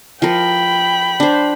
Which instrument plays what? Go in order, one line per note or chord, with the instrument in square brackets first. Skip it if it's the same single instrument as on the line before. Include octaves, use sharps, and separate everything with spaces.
[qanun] F3 A#4 [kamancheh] G5 B5
[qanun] D4 C5